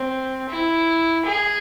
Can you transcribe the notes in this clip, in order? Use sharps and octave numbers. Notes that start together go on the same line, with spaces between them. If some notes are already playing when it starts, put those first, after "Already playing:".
Already playing: C4
E4
G#4